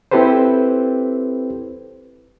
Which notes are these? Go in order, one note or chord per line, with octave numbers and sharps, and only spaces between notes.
C4 E4 G4 A4 B4 C5